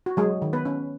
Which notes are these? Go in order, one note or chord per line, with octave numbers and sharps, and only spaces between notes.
F#4
F#3 G#3 G#4
D#3
B3 B4
C#4